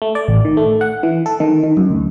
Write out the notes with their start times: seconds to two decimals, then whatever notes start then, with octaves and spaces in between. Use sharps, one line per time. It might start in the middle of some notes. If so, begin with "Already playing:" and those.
0.02 A3
0.15 D5
0.28 A1
0.45 D#3
0.57 A3
0.81 F#5
1.03 E3
1.26 A4
1.40 D#3
1.64 D#3
1.77 F#2
1.90 D2